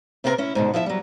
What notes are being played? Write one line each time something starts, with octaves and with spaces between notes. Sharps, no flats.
C3 A#3 C4 F4 A#4 B4
C#4 E4
G#2 B2 D3
F3 E4 C#5 E5
F#3 G3